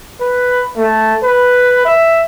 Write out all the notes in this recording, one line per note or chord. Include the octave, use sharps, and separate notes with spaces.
B4
A3
B4
E5